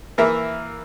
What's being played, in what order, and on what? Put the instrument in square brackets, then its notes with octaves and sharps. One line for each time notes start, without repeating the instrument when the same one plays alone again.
[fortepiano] E3 A#3 A#4 E5